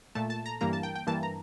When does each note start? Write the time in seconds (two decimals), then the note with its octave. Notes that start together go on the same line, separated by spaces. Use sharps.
0.15 A#2 A3 A5
0.30 A5
0.46 A#5
0.61 G2 E3 G3 A#3 A#5
0.73 A5
0.83 G5
0.95 G5
1.07 G2 E3 A#3 A5
1.23 A#5